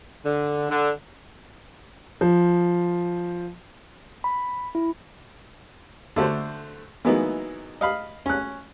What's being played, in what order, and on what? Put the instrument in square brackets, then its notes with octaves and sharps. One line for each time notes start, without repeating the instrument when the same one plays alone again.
[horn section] D3
D3
[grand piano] F3
[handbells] B5
E4
[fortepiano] D3 A3 F#4 C5
E3 F#3 G#3 A#3 B3 D#4
D#5 F5 B5
C#4 F#6